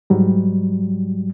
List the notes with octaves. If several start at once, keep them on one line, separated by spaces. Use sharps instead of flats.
G#2 F#3 G3